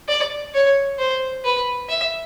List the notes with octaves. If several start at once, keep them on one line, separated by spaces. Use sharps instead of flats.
D5
C#5
C5
B4
E5